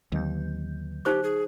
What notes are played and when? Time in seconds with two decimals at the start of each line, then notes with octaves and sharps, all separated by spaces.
0.12 D#2 D3 F#3 G6
1.05 D#4 G4 C5 C#6
1.23 G#4